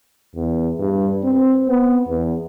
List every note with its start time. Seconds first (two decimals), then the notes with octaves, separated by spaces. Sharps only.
0.35 E2
0.79 G2
1.24 C4
1.68 B3
2.08 E2